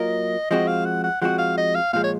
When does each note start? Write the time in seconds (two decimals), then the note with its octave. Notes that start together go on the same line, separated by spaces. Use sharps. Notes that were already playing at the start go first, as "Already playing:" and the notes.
Already playing: F#3 A#3 F4 A#4 D#5
0.50 F3 G#3 C4 F#4 D#5
0.67 F5
0.85 F#5
1.04 F#5
1.22 F3 G#3 C4 F#4 F#5
1.39 F5
1.58 D#5
1.75 F5
1.93 A#2 F3 G#3 F5
2.04 C#5